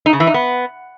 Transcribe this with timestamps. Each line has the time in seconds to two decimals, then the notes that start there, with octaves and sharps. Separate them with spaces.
0.06 D#4
0.13 C#3
0.20 E3
0.27 D#4
0.34 B3